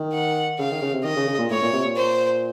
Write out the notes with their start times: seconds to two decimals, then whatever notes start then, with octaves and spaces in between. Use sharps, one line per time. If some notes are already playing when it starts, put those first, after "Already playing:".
Already playing: D#3
0.13 F#5
0.59 C#3 F5
0.71 D#3
0.82 C#3
0.94 C3
1.04 D#3 D#5
1.16 C#3
1.28 C#3
1.38 A#2
1.50 A2 C#5
1.62 A#2
1.73 C3
1.84 A#2
1.96 C5